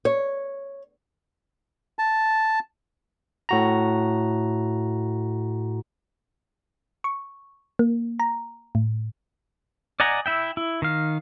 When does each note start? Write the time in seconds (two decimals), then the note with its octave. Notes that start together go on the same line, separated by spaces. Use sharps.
0.05 C#5
1.98 A5
3.49 A2 F#4 A#5
7.04 C#6
7.79 A#3
8.20 A#5
8.75 A2
10.00 D5 D#5 F#5 G#5 A#5
10.26 E4 E5 G5
10.57 E4
10.82 D#3 F5